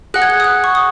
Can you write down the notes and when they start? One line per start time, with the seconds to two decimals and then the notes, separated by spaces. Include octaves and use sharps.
0.14 G#4 F#5 F#6
0.22 G#6
0.30 F#6
0.40 D#6
0.44 F#6
0.64 C#6
0.75 D#6